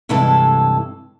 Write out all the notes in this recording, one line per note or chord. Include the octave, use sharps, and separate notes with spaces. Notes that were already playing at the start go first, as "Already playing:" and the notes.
G2 C3 E3 G#3 A4 A5